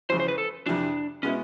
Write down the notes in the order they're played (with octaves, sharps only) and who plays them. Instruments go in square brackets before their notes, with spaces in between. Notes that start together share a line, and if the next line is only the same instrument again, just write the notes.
[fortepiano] F2 C#3 E3 [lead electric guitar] C5
[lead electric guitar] C5
B4
A4
[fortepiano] F2 C3 E3 [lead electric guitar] D4
[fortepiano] B2 G#3 B3 E4 [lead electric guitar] C#4